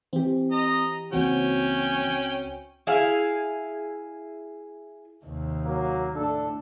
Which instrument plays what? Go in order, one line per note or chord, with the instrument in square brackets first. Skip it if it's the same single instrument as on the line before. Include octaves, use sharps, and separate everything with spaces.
[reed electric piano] E3 G4 [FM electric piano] C4
[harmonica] D#5 A#5
[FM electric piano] C#2 C4 F#4 [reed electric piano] E3 A#3 [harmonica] C#4 G5
[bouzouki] E4 G#4 F5
[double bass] D#2 C3
[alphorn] F#3 [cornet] A#3
[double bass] A2 [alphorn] D4 [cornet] A4